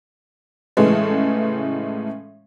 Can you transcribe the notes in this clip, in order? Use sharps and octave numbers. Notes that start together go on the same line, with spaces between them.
A2 C#3 E3 G#3 A3